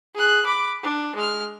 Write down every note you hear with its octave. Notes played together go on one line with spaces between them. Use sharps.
G#4 F#6
B5 D6
D4
G#3 F6